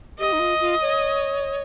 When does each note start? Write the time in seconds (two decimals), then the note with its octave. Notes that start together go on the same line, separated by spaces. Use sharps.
0.19 G4 D#5
0.33 D#4
0.39 F4
0.61 F4
0.82 C#5